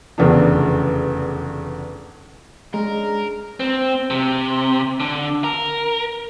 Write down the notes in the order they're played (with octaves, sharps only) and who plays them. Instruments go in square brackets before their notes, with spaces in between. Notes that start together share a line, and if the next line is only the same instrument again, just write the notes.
[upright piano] F1 E2 C#3 D4
[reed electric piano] G#3 [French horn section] C#4 D4 G#4 [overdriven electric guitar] A#4
[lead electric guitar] C4
C3
D3
A#4